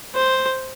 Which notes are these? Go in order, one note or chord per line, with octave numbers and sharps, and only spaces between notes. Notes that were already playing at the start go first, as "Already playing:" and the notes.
C5